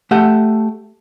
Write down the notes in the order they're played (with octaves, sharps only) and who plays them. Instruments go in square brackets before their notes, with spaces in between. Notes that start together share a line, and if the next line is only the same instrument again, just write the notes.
[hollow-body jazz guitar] A3 G4 A4 F#5